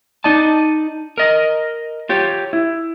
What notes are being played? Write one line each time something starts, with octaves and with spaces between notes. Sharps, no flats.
D#4 D5 D#5 A5
A#4 D#5
F4 G4 C#5
E4